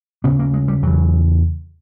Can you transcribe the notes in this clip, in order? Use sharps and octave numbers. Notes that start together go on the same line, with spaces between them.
D#2 C#3 B3
A#3
G#3
G3
E2 C#3 F#3